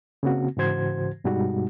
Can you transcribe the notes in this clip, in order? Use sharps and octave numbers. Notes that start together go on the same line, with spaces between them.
C#3 A#3 C4 F#4
G#2 C#3 E3 F#4 C5 G#6
G2 B2 G3 G#3 D#4 F#4